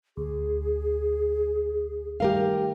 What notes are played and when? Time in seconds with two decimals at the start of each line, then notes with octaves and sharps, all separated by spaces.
0.17 D2 G#4
2.20 D#3 G3 A3 G4 A#4 F5